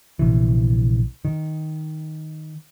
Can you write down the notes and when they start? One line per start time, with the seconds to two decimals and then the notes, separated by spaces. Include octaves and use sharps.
0.19 A#1 C3 E3
1.25 D#3